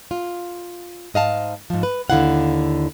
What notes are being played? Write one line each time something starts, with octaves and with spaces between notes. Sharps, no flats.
F4
G#2 D#5 F5 A5
G#2 F3
B4
D#2 D3 F#3 E4 F5 F#5